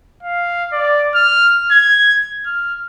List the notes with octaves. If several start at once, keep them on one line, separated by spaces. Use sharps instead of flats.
F5
D5
F6
G#6
F6